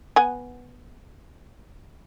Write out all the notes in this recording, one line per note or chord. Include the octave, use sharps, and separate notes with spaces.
B3 F#5 G#5